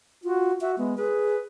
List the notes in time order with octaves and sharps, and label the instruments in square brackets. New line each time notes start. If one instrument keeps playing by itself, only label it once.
[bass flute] F4 [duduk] F#4
[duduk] F#4 [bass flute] E5
[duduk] G#3 [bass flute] B3
[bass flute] G#4 [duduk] B4